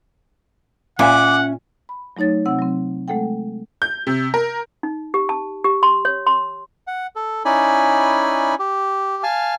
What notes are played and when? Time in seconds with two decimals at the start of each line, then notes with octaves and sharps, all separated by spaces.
0.99 A#2 C#4 E5 F#5 G#5 D6
1.89 B5
2.17 F#3 A3 D#4 C#5 A6
2.46 C3 C4 F#5 E6
2.58 F#3 C4
3.08 G#3 A3 A4 F#5 G5
3.82 G6
4.07 C3
4.34 A#4
4.83 D#4
5.14 G4
5.29 A5
5.64 G4
5.83 C6
6.05 C#5
6.27 C6
6.87 F#5
7.16 A4
7.45 C#4 D#4 E4 D5 G#5 B5
8.59 G4
9.23 F5 G#5 A5 F6